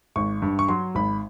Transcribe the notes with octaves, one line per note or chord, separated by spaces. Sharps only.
G#1 C#6
G2
C#6
F#3 C6
G#1 B5